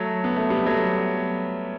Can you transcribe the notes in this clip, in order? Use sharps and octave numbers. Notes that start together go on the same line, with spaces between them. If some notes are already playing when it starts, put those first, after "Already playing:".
Already playing: F#3 A3
B3
A3
G3 B3
F#3 A3